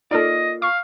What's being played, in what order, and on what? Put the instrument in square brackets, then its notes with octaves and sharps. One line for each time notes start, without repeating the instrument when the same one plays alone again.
[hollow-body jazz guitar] A#3 F4 D5 [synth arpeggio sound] D#4 A4 [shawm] D#5
[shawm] F5 [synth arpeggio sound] C#6